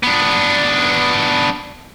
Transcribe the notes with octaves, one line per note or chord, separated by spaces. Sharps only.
B3 D4